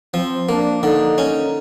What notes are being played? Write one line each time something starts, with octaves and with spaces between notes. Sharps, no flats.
F3 C4
A#3 D4
D3 D#4
C#4